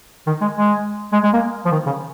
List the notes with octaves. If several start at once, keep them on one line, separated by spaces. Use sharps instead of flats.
D#3
G#3
G#3
G#3
G#3
A#3
F3
D#3
C#3